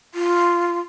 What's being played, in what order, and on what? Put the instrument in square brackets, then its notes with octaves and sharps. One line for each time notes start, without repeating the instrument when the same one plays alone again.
[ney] F4